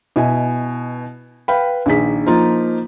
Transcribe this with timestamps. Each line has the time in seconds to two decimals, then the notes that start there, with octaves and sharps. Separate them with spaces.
0.16 B2 E4 D#5 G#5
1.48 B4 F5 G5 B5
1.86 A#1 D#3 G#4 B6
2.26 F3 A#3 D#4 F4